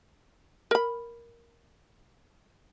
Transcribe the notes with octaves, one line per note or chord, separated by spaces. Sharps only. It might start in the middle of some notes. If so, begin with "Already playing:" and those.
A#4 B5